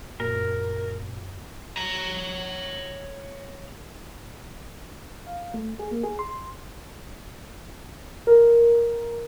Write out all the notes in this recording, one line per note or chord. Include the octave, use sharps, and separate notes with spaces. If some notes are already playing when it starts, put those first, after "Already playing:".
F#2 A#2 A#4
C#5 A#5
F5
A3
G#4
A#3
G#4
C6
A#4